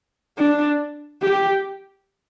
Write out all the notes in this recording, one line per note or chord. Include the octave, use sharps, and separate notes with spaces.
D4
G4